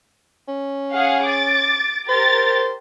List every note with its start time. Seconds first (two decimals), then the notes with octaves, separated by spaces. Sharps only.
0.48 C#4
0.94 G#4 F5 F#5
1.26 D6 A6
2.09 G4 A#4 C5 A6